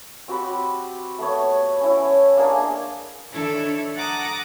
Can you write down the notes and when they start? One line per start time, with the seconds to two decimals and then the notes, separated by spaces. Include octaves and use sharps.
0.28 C4 F#4 G4 B5
1.19 A3 B3 C#5
1.81 C#4 E4
2.37 A#3 D4 G#4
3.32 D#3 D4 E4 A4 C#5
3.96 F#5 A5 A#5 D6 D#6